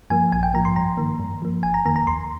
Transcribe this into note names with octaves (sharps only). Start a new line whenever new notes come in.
G2 F3 A#3 G#5
A#1 G#5
G5
G#2 F3 A#3 A#5
C6
G2 A#5
D#3 A#3
G2
F3 A#3
G1 G#5
A#5
F2 D#3 A#3 A#5
A#5
D#2 C6